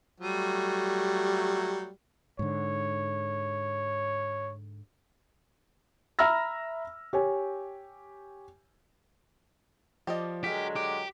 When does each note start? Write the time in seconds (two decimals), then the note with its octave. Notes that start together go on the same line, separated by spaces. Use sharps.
0.20 F#3 G3 A3
2.39 G#2 D3 C#5
6.19 E5 A#5 B5 E6 F6 A#6
7.13 G4 C#5 G#5
10.07 F3 G4 D5 D#5
10.44 D3 F#3 G#3 F#4 G4 A#4 B6
10.76 G4 D6